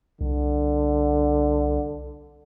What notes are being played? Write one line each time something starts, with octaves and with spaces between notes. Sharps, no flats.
C2 D3